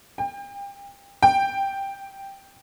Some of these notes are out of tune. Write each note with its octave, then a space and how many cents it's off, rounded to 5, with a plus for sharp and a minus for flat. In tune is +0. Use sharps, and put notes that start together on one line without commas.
G5 +30
G5 +0